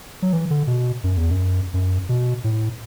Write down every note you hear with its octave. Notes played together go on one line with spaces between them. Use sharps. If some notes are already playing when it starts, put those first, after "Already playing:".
F#3
E3
D3
B2
F#2
E2
F#2
F#2
B2
A2